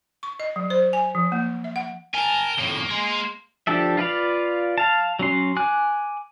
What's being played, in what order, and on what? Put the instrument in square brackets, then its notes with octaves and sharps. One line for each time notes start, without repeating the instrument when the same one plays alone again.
[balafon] C#6
D#5
F#3
C5
G#5
F3
A#3
E5
F#5
[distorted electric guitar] A#4 [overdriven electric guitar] G#5 A5 [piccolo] G7
[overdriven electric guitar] F2 A2 [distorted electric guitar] A#3
[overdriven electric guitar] G#3 G#4 [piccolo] C6
[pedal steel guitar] F3 D4 G4 A4 E5
F4 B4 D5 F5
F5 A5
F#3 C#4 C6
G#5 D6 F#6